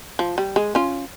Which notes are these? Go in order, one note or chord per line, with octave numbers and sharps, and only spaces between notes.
F3
G3
G#3
C#4 F4